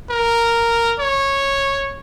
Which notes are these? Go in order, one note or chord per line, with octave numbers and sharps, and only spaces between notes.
A#4
C#5